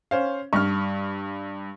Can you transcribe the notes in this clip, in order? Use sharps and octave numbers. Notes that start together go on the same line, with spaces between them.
C#4 C5 F5
G2 C#6 F6